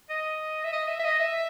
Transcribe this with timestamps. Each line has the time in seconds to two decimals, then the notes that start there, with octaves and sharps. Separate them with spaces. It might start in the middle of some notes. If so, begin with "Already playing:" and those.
0.10 D#5
0.64 E5
0.73 D#5
0.88 E5
0.99 E5
1.04 D#5
1.20 E5